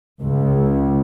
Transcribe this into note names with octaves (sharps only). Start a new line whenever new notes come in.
C#2